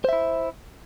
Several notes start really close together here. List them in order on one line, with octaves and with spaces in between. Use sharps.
C5 E5 E4